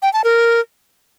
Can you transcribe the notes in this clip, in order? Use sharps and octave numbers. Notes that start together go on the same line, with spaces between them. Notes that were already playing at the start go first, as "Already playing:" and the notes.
G5
A5
A#4